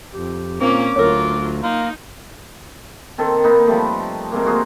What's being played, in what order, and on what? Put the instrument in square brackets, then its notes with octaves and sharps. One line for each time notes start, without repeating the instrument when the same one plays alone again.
[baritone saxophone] F2 [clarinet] G4
[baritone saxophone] A#2 [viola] A#3 C#4 [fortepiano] C4 [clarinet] D6
[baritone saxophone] D2 [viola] F#3 F4 [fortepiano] A#4 C#5
[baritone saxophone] A#3 [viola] D#4 [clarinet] C6
[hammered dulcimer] D#3 C4 A4
A#3 D#4 B4
F3 G3 A3
C3 G#3 A#3
F#4 G#4 A#4 C5